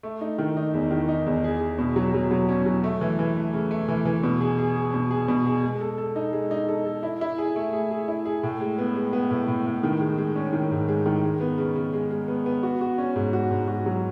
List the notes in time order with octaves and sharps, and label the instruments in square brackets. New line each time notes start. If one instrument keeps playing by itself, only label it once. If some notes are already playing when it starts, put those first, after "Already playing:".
[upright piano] A3
D#4
D#3
D#4
E2
D#3
D#4
E2
G#4
G#4
B2
F#3
F#3
F#3
C#4
F#3
A3
E3
E3
A3
C#3
A3
E3
E3
B2
G#4
G#4
G#4
B2
G#4
B2
G#4
G#3
A4
A4
D#4
G#3
D#4
A4
A4
E4
E4
G#4
A3
G#4
G#4
E4
G#4
A2
G#3
B3
G#3
B3
A2
A2
A2
D#3
G#3
G#3
C#4
D#3
G#2
G#3
D#3
G#3
B3
C#3
C#3
G#3
G#3
B3
B3
F#4
F#4
C#4
G#2
F#4
G#2
F#4
F#3